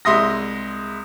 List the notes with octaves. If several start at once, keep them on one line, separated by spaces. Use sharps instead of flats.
C2 G#3 E5 C6 D#6 A#6